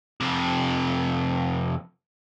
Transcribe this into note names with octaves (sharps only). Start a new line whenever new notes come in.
F2 C3